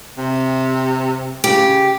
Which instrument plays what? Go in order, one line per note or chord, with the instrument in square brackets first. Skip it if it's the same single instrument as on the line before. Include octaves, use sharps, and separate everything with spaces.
[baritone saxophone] C3
[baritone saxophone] C#3 [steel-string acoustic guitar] G4